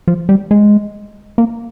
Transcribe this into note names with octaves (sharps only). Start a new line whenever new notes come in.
F3
G3
G#3
A#3